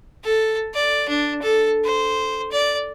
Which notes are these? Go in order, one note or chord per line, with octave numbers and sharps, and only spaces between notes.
A4
D5
D4
A4
C5
D5